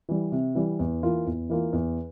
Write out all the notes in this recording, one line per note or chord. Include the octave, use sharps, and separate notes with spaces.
E3 G3
C3
E3 G3
E2
E3 A#3 F4
E2
E3 A#3 F4
E2